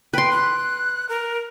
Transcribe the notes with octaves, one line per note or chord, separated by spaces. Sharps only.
B4 G5 C6
F#6
A#4